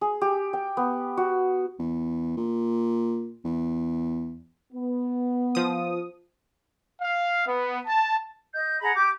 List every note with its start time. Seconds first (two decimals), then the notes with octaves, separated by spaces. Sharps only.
0.01 G#4
0.21 G4
0.53 G5
0.77 B3
1.17 F#4
1.79 E2
2.37 A#2
3.45 E2
4.73 B3
5.55 F3 D#6
7.01 F5
7.47 B3
7.86 A5
8.52 D#5 G6
8.81 G#4 F#5 A#5 B5
8.95 G4 D6 G6